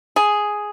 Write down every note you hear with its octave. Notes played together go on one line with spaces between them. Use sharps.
G#4